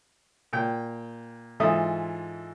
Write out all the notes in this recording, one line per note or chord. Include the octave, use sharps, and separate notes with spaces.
A#2 G5
G#2 E3 F4 A4 E5 D#6